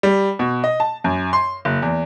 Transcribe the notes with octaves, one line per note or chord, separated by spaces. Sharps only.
G3
B2
D#5
A5
F#2
C6
F#1
E2